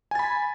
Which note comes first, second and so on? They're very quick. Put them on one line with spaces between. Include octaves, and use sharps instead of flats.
G#5 A6 B5